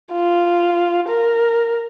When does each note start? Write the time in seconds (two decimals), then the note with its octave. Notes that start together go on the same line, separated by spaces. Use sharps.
0.12 F4
1.08 A#4